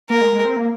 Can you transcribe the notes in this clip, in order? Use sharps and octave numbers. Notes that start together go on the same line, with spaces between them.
A#3 A#4
G#3
G#3
C4
A#3